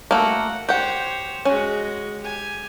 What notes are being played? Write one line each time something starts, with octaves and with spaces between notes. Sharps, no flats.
A3 A#3 F#4 F#5
G4 C5 C#5 F#5
G#3 C#4 F#4
G4 G#5